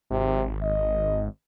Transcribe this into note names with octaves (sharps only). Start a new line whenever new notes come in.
G#1 C3
D#5